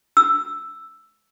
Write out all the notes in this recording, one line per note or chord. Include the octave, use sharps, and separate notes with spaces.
E6